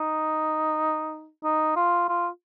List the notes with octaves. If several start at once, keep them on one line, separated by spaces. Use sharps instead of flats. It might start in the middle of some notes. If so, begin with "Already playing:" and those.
Already playing: D#4
D#4
F4
F4